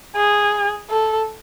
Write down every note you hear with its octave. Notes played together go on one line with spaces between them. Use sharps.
G#4
A4